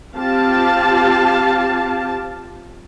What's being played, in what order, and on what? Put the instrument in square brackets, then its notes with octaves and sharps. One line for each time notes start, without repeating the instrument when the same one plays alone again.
[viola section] C4 F4 G4 F5 A5